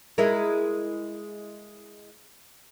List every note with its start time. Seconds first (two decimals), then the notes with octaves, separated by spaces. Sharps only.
0.18 G#3 E4 A#4